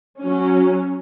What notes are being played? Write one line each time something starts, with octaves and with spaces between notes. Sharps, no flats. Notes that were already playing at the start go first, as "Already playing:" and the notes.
F#3 C#4